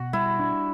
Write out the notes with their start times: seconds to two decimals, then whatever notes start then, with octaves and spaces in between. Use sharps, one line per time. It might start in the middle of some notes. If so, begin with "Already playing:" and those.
Already playing: B2 F#4
0.13 G3 E4
0.40 D4